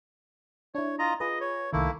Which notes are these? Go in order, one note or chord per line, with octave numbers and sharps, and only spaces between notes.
D4 E4 C#5
F4 D#5 A#5
F4 G#4 B4 D#5
C#5
C2 D#3 A3 A#3 E4